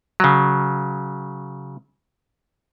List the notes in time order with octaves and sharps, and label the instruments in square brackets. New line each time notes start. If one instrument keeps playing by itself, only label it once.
[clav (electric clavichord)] C#3 F#3